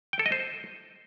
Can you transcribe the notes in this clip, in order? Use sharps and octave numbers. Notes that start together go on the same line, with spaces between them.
G5
A4
D#5
C5